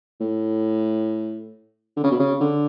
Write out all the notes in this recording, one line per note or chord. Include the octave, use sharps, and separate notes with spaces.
A2
D3
C#3
B2
C#3
D3